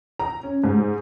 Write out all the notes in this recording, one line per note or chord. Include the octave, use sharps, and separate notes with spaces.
A#5
C#4
G#2